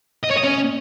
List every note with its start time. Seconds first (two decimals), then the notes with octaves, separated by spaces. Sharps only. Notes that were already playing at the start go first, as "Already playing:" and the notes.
0.23 D#5
0.30 C#5
0.37 D#5
0.43 C#4